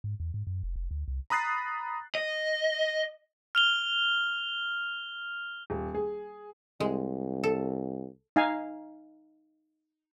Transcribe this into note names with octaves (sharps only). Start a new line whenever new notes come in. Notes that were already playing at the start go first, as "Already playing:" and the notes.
G#2
E2
G#2
F#2
F1
F1
D2
C2
A#5 B5 D#6 F#6 A6 C7
D#5
F6 F7 G7
D#1
G#4
C2 G#3
A4
D#4 F5 G#5